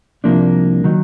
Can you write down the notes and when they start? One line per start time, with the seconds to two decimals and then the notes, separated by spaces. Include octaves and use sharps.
0.24 C2 C3 F3 A#3 D4
0.84 D#3 F#3